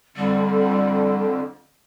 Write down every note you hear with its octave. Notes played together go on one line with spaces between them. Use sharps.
F2 D3 G3